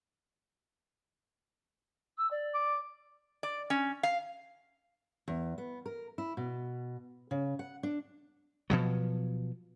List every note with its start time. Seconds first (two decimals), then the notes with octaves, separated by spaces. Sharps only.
2.17 E6
2.30 D5
2.54 D6
3.43 D5
3.70 C#4
4.03 F5
5.28 E2
5.58 B3
5.86 A#4
6.18 E4
6.37 B2
7.31 C#3
7.59 F#5
7.83 D4
8.70 B2 F3 F#3